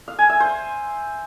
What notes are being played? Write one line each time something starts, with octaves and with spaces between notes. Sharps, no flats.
F5
G#5
E5
C5